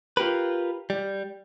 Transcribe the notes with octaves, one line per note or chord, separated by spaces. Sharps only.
F4 G4 A#4 B4
G3